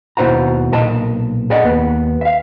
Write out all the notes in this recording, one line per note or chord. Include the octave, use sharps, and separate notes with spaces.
D#2 B2 E4 C5 F#5 A#5
B1 A#2 A#4 D#5 A5
G#4 D5 D#5 F#5
D#2 B3
E5 F5